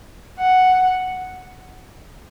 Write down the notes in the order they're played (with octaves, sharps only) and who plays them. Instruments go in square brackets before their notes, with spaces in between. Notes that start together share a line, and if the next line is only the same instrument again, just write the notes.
[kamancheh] F#5